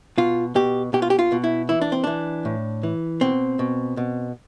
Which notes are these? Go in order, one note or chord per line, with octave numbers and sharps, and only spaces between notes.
B2 F4
B2 G4
B2 G4
F4
G4
F4
B2
E4
E3 E4
D4
C4
E3 D4
A2
E3
B2 C4
B2
B2